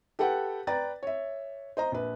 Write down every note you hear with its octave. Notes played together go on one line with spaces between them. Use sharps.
G4 A4 B4 F#5 G5
B4 D5 G5 A#5 A6
C#5 E5
C5 D#5 A#5
A#1 B4